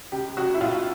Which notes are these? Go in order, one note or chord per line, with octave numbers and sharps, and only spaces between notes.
C#2 G4
C#2 F#4
E4
B2 F4